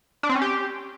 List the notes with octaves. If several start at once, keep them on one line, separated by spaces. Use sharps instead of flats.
D4
C4
C#4
G4